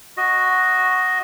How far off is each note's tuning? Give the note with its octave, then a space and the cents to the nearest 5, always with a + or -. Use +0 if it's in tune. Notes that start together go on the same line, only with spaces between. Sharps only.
F#4 +0 D#5 +0